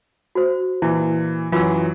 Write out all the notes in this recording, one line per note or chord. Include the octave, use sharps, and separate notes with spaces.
F#4 C5
A#2 E3 E4
F#2 E3 F#3 F4 E6